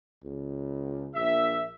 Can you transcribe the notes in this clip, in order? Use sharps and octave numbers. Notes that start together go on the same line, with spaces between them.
C#2
A#1 E5